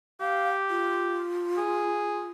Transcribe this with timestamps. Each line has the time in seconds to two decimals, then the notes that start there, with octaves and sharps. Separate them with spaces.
0.21 G4 F5
0.70 F4
1.57 G#4